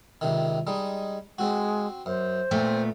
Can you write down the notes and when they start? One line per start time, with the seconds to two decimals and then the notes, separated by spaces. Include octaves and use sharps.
0.21 C#2 C3 D#3
0.67 G3 G#3 D#4
1.38 G#3 C4 F#4
2.06 F#2 C5
2.51 A#2 A3 B3 C4